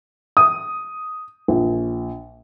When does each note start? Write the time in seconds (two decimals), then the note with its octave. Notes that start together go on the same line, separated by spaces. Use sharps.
0.37 D#6
1.48 A#1